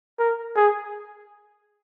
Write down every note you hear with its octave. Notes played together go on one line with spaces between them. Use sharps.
A#4
G#4